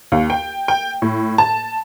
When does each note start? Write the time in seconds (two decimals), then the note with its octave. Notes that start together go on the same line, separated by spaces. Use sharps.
0.12 D#2
0.30 G5
0.68 G5
1.02 A2
1.38 A5